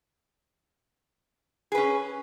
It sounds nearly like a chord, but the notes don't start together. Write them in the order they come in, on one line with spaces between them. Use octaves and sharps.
G#4 B4 C#4